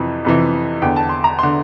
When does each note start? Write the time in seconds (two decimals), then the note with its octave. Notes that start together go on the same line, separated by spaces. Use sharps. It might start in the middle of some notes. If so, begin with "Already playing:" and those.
Already playing: F2 C3 E3
0.25 F2 C3 E3
0.82 E2 D3 G5
0.96 A5
1.09 C6
1.24 A#5
1.39 D3 C6